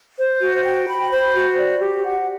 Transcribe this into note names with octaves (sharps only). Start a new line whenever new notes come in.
C5
F#4
G5
B5
C5
F#4
D5
G4
F#5